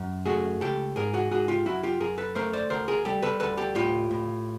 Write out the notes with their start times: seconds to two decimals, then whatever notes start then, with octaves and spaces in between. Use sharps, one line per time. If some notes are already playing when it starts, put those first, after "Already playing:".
Already playing: F#2
0.26 A3 F#4 G#4
0.61 C#2 G4 A4
0.96 G#2 G#4 A#4
1.13 F#4 G#4
1.31 G#2 F#4 G#4
1.48 F4 G4
1.66 F#2 E4 F#4
1.83 F4 G4
2.00 F#2 G#4 A#4
2.18 A4 B4
2.35 A3 A#4 C5
2.53 C5 D5
2.70 D2 A#4 C5
2.88 G#4 A#4
3.05 G3 G4 A4
3.22 A4 B4
3.40 D2 A4 B4
3.57 G4 A4
3.75 A2 F4 G4
4.11 A2